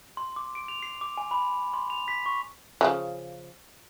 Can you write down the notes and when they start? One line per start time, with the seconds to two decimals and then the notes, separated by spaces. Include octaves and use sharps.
0.17 C6
0.36 D6
0.55 D7
0.68 F7
0.82 C7
1.01 D6
1.17 G#5
1.31 B5
1.74 C6
1.90 F7
2.08 B6
2.26 C#6
2.81 C#3 F3 F#3